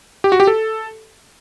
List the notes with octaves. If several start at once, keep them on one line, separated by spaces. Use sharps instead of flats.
G4
F#4
G4
A4